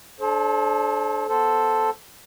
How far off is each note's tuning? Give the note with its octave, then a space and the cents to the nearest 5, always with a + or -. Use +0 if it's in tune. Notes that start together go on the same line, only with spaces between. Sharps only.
D4 +10 A4 -35 C5 +30
B3 -10 A4 +0 C5 +0